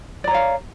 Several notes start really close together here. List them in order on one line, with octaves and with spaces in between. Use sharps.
D5 A#5 C#5 F5